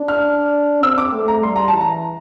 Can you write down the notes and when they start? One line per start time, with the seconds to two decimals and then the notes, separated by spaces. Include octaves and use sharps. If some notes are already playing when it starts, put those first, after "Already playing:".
Already playing: D4
0.08 F6
0.83 C4 E6
0.98 D6
1.14 A3
1.28 A#5
1.43 G3 C6
1.56 A#5
1.68 A5
1.73 E3
1.81 A#5